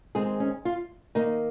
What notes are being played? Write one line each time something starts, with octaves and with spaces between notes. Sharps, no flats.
D#3 G#3 C4 G#4
C#4
F4
D#3 A#3 D#4